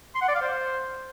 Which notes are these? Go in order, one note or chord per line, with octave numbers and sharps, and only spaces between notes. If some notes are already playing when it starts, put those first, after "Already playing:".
C6
F#5
D5
F5
C5